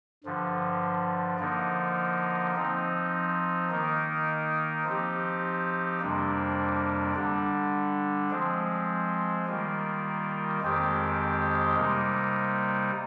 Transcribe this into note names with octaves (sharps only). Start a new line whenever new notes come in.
G2 D3 F3
D3 F3 A#3 D#4
F3 C4 D#4
D#3 A#3 D#4
F3 C4 D#4 G4
F2 C3 G3 A#3 D4
D3 G3 D4
F3 G#3 C4
D#3 G3 A#3 F4
F2 D#3 G#3 C4 G4
C3 G3 A#3 D#4